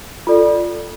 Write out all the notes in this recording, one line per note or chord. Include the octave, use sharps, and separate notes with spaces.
F4 A4 D5